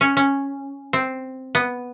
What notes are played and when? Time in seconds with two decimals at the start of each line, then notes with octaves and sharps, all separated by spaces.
0.01 C#4
0.17 C#4
0.93 C4
1.55 B3